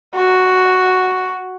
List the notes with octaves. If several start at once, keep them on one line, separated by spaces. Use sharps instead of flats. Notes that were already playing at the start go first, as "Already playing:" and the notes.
F#4